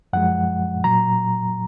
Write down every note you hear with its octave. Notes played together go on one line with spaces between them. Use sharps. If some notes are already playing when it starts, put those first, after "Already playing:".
F#2 F3 G#3 F#5
A#2 F#3 A#5